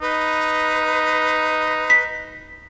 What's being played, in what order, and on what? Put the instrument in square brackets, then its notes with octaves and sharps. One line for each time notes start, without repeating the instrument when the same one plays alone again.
[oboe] D#4 [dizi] B4
[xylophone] B6